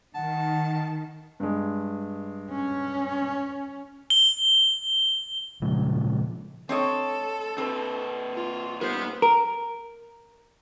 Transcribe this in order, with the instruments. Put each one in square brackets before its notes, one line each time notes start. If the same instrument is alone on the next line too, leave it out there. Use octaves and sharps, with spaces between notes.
[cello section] D#3 [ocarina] F#5 [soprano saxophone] A5
[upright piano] G2 G#3
[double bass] C#4
[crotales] G7
[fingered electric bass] A#2 C#3 F3 G#3
[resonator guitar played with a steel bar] C4 C#5 D#5 [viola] A4
[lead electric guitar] C3 B4 [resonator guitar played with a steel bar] C4
[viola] F4
[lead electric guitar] A#2 G3 [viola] B3 [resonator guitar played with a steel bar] A#4 C5
[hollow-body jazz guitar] A#4